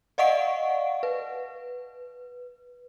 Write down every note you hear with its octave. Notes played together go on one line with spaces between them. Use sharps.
D5 D#5 F5 F#5 C#6 D7
B4